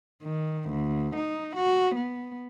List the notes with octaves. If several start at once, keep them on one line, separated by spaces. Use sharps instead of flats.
D#3
D2
D#4
F#4
B3